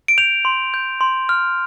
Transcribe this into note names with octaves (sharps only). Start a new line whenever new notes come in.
D7
G6 F7
C6
G6
C6
F6